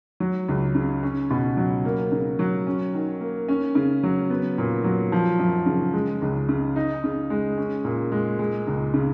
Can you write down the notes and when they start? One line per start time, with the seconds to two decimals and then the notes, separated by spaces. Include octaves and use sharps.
0.20 F#3
0.49 C#2
0.75 C#3
1.03 C#4
1.30 B2
1.57 F#3
1.85 A#3
2.12 C#3
2.39 F#3
2.67 C#4
2.94 D#3
3.21 A#3
3.48 C#4
3.75 C#3
4.03 F#3
4.30 B3
4.58 A#2
4.84 F#3
5.12 F3
5.39 F#2
5.66 C#3
5.93 G#3
6.22 C#2
6.49 C#3
6.76 D#4
7.04 C#3
7.30 G#3
7.58 C#4
7.84 A#2
8.12 G#3
8.39 G#3
8.67 C#2
8.94 C#3